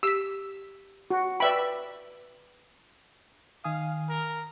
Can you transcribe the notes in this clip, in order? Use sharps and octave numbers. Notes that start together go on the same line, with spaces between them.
G4 E6 B6
F#4
B4 D5 E5 G5 B5
D#3 F5 G#5 D#6
A#4